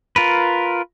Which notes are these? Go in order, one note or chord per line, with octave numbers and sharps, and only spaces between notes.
F4 A#4 B4